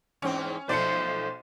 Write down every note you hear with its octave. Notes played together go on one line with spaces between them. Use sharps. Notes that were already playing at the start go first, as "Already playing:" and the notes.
E2 G#2 C4 C#4
B1 F3 A3 C5 D5 C#7